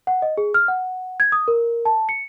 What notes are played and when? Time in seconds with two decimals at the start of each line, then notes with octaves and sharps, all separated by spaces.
0.07 F#5
0.22 D#5
0.37 G#4
0.54 F6
0.68 F#5
1.20 G#6
1.32 D#6
1.48 A#4
1.85 A5
2.09 C#7